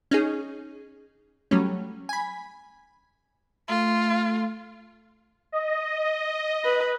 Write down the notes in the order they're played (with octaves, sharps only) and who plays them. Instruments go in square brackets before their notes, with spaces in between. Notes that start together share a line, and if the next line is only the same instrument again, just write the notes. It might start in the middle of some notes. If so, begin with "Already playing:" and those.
[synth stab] C#4 D#4 G#4
F#3 G3 A3 C#4
G#5 B5
[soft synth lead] A3 [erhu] F4
[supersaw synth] D#5
[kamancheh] B4